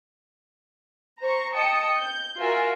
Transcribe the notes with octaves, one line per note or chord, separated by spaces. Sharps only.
C5 A#5 C#6
D#5 G5 A5 D#6 C#7
G6
F4 F#4 A#4 E5 G#5